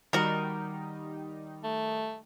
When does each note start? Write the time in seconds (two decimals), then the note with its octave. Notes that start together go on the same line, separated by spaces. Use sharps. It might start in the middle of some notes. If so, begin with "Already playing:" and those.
0.13 D#3 G3 D#4 F#4 A#4
1.64 A3